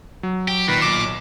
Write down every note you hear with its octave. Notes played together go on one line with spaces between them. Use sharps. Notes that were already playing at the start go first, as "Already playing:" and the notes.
F#3
G4
A#2 D#3 B4
B1 D6 E7